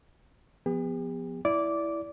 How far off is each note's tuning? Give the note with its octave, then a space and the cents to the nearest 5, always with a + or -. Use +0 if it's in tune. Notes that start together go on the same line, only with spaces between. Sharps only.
F3 +0 B3 +0 G4 +45
E4 +0 D5 -20 D6 -10